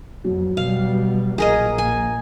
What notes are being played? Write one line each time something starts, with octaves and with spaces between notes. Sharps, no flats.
F2 B2 F#3
B2 G3 F5
A#1 A#3 G#4 A#4 D#5
G#5